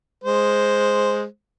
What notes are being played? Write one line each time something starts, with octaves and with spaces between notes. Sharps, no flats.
G#3 C5